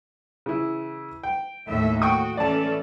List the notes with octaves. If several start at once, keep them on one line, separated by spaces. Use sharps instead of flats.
C#3 E3 E4
G5
D#2 A2 E5
F#4 G5 C#6 D#6
E3 C#4 A4 D5 A5